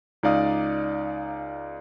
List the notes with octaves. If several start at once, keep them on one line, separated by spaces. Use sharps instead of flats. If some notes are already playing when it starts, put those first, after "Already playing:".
C#2 D#4 D5 F5 D#6